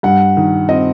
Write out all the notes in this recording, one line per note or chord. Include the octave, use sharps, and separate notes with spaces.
G2 F#5
D#3
C4 D#5